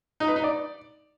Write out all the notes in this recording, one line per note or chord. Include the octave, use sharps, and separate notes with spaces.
D#4
B4
D#4
D5